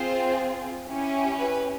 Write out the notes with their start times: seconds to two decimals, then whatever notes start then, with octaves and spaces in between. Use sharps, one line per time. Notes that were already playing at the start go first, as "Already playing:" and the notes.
Already playing: C4 F4 G#4 C5
0.87 C#4 E4 G4
1.39 B4